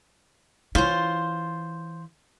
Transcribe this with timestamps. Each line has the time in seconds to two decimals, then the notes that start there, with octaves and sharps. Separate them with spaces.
0.75 E3 C#4 E4 F4 C5